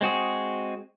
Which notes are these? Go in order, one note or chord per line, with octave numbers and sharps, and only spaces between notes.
G#3 C4 F#4 G#4